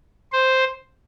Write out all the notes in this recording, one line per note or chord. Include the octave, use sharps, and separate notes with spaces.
C5